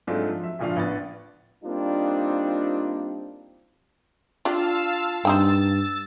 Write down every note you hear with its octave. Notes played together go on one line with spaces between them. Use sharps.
G#2 F#3 A3 C4 D4 F4
F3
E5
G#1 A#2 F3 D4 F5
A1 B3 D4 A6
G3 A#3 C4 D4 D#4 F4
D4 F4 G4 F5 A5 E6
G2 C4 D#4 G5 E6 A6